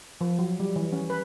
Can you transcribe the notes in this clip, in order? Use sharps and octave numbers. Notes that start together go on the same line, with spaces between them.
F3
F#3
G3
E3
C#4
B4